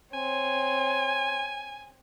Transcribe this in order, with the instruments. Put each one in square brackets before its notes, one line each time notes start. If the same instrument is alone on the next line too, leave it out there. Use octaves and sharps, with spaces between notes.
[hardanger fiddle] C4 C#5 [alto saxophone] G#5